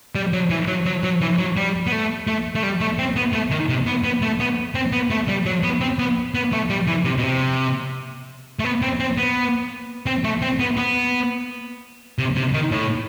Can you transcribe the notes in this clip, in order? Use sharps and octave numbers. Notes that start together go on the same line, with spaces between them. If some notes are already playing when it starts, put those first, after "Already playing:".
G3
F#3
E3
F#3
F#3
F#3
E3
F#3
G3
B3
A3
A3
A3
G3
A3
C4
B3
A3
D#3
C3
B3
B3
A3
B3
C4
B3
A3
G3
F#3
B3
C4
B3
B3
A3
G3
E3
C3
B2
C3
A3
B3
C4
C4
B3
C4
A3
C4
B3
B3
C3
C3
D#3
A2